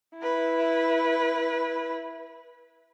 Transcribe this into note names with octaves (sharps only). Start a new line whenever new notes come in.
E4 B4